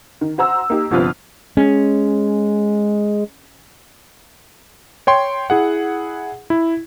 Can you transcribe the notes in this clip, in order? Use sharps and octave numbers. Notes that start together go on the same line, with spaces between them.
D#3
F#4 C5 A#5 E6
A#3 D#4 G4
G1 C3 F3 F4 B4 F6
G#3 C#4
C#5 G5 C6
E4 G#4 F#5
E4